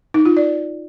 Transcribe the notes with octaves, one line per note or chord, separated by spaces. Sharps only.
D#4
F4
D5